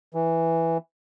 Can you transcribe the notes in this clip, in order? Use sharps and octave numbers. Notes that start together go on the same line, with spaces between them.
E3